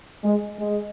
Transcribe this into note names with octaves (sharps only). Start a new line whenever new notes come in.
G#3
G#3